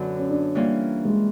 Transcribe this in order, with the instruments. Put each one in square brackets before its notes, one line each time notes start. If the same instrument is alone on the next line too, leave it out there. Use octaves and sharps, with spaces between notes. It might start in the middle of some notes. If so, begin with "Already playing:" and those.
Already playing: [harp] F#2 D3 F#3 B3
[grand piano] C#4
D4
[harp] E3 G3 A#3 C#4 F4
[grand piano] G#3